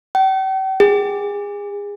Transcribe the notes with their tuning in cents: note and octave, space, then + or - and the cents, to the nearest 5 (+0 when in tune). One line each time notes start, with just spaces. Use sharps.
G5 -40
G#4 -30